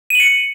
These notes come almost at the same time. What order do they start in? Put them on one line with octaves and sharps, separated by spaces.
D#7 F#7 C#7